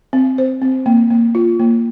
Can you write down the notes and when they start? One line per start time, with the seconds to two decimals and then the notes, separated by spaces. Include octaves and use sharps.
0.13 C4
0.38 C5
0.62 C4
0.86 A#3
1.10 A#3
1.35 F4
1.60 A#3